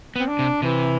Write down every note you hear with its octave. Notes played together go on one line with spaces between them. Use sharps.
B3
C4
D4
C3
C3 E3